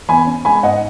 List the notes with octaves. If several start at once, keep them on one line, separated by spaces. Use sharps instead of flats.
E2 G#5 B5
C#4
G#3 G#5 B5
G#2 D#5 F#5